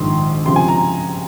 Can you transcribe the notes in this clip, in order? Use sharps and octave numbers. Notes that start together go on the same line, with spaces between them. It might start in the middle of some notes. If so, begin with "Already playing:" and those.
Already playing: A#1 G#2 D#3 C6
C#2 C3 F3 C6
G#5
A#5